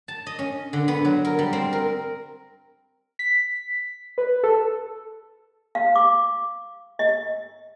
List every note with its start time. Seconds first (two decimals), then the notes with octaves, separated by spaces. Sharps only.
0.08 A5
0.27 D#5
0.39 C#4
0.73 D3
0.88 B3
1.05 F#3
1.25 A#4
1.39 G3
1.53 C4
1.73 A#4
3.19 B6
4.18 B4
4.44 A4
5.75 F5
5.96 D6
6.99 D#5